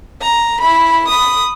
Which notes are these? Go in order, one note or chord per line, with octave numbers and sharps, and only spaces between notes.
A#5
E4 B5
B5 D#6